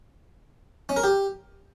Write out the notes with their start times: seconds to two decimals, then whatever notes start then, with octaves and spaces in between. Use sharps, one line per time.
0.89 C#4
0.96 A#4
1.04 G4